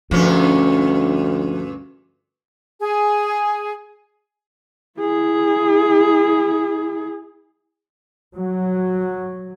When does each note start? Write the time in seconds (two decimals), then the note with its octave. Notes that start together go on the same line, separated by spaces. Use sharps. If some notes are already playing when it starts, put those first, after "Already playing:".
0.11 D2 G2 A#2 F3 C#4
2.79 G#4
4.99 E4 G#4
8.35 F#3